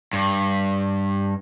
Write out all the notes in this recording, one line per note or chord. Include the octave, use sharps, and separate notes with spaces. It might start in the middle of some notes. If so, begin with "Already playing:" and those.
G2